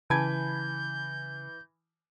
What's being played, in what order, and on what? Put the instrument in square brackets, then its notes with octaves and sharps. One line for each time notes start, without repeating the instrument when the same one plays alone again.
[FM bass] C#3 [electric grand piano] E3 B5 G#6 [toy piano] G#5 A5 [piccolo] G6